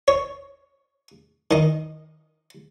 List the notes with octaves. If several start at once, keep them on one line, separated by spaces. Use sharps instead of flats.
C#5
D#3 D#5